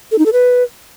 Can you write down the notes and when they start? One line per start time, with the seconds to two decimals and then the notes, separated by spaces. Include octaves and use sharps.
0.12 A4
0.19 D#4
0.26 A4
0.33 B4